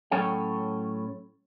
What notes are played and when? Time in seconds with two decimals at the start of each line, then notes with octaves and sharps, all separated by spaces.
0.11 A2 F#3 C#4 A4 C#5 G5